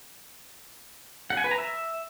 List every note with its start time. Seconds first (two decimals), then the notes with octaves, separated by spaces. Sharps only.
1.30 F#5
1.37 G#5
1.44 B4
1.51 A#5
1.58 E5